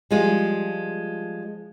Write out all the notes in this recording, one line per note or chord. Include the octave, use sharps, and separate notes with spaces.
F3 G3 G#3 F4